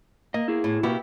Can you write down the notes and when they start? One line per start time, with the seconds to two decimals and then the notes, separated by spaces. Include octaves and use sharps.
0.34 A#3 D#5
0.48 E4 G#4
0.64 A2
0.83 B2 A#3 B3 E4 F#4 G4